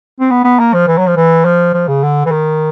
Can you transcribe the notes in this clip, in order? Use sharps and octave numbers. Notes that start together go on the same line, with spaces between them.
C4
B3
B3
A#3
F3
E3
F#3
F3
E3
F3
F3
C#3
D3
E3
D#3